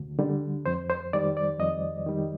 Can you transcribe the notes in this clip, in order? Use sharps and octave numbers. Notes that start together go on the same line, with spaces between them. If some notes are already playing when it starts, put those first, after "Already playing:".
Already playing: D2 D3
D3 G3
F2 C5
C5
D#3 G3 D5
D5
F2 D#5
D#3 G3